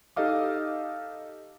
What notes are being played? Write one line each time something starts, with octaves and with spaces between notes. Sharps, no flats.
D#4 G4 A4 D#5 F5 D6